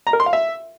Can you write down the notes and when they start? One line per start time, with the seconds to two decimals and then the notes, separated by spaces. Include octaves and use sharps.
0.07 A#5
0.13 A#4
0.20 C6
0.26 F5
0.33 E5